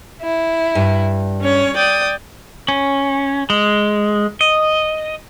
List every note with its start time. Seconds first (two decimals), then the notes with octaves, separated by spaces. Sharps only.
0.22 E4
0.75 G2
1.42 C#4 C#5
1.76 D5 G5 D#6
2.68 C#4
3.50 G#3
4.41 D#5